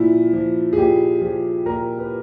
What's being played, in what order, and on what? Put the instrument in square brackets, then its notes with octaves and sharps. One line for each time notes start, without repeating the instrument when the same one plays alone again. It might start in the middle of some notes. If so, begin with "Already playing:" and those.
Already playing: [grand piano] A#2 F3 E4
F3
G#4
A#2 G4
F3 G#4
A#2 A#4
B4